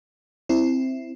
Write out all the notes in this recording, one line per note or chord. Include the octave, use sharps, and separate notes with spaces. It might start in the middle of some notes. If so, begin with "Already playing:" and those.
C4 E4